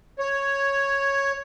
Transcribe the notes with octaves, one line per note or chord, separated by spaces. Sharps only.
C#5